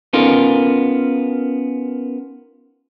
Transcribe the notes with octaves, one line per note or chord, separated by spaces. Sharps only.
B3 C#4 D#4 F4 A4 A#4